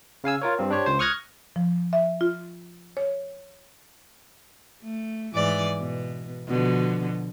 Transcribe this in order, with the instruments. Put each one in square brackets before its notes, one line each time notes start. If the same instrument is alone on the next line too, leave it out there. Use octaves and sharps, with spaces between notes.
[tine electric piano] C#3 F5 G#5 E6
F4 A#4 C#5
G2 C4
D4 G4 C5 C#5
C#2 C5
C#6 D#6 F6 F#6 G#6 A#6
[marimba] F3
E5
F4
C#5
[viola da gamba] A3
G#2 E3 D5
B2
B2 D3 F3